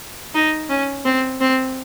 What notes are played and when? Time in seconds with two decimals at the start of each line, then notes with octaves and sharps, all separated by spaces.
0.34 D#4
0.69 C#4
1.05 C4
1.41 C4